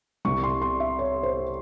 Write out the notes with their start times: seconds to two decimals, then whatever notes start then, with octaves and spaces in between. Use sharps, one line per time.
0.25 C2 C3 G3 C#6
0.44 C6
0.62 C6
0.80 E5
0.99 C#5
1.23 C5